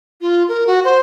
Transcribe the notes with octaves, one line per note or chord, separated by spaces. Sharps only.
F4
A#4
F#4
C5